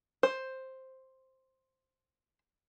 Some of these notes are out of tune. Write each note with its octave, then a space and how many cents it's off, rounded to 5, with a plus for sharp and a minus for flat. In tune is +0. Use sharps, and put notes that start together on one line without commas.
C5 +5